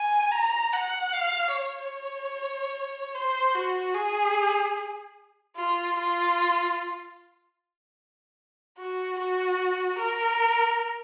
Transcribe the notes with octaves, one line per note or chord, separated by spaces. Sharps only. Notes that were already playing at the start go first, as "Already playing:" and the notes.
Already playing: G#5
A#5
F#5
F5
C#5
C5
F#4
G#4
F4
F4
F#4
F#4
A#4